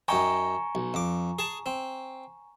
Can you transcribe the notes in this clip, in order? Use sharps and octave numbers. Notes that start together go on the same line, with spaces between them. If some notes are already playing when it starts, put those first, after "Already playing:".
F#2 D#4 G5 G#5 A#5 C#6
B1
F2 D6
G#4 A5
C4